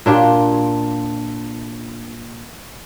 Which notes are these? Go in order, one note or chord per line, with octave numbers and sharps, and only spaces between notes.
A#2 D4 F4 G4